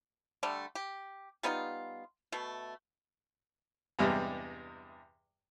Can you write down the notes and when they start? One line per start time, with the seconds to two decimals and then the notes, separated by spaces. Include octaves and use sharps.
0.43 D3 G3 A3
0.75 G4
1.43 G3 B3 D#4 F4
2.32 B2 A3
3.99 E2 G2 C3 G3 G#3